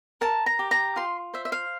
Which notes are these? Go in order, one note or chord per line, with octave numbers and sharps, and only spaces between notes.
A#4 A5
A#5
G4
A#5
F4 C6
C5 E5
E5
F5